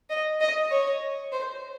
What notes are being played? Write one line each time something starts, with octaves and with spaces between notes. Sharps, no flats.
D#5
D#5
C#5
C5